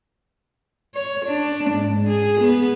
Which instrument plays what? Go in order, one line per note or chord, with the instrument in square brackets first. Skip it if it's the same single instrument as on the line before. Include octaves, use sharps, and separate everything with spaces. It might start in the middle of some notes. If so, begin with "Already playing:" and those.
[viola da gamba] C#5
D4
G#2
G#4
B3